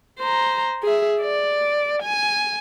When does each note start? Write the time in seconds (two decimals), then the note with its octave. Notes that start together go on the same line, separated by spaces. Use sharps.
0.19 C5 A#5
0.83 G#4 E5
1.21 D5
2.03 G#5